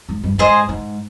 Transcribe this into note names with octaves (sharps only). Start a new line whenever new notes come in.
G#2
G2
G#2 G#4 C5 D#5
G#2